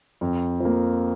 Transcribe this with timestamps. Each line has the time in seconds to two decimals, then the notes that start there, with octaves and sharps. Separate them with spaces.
0.21 F2
0.60 F3 A#3